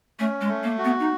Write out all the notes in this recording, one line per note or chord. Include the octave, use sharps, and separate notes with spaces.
A3 C#4
G#3
A3
A#3
F#4
B3
D#4